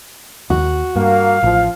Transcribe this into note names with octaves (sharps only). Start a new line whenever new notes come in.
D#2 F#4
G2 A#3 F5
A1 F3